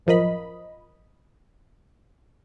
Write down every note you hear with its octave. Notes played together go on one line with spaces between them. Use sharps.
A1 F#2 F3 A#4 D#5 B5